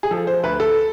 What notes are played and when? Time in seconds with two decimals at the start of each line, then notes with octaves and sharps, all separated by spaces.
0.03 G#4
0.11 F3 A4
0.27 C5
0.43 D2 B4
0.60 A4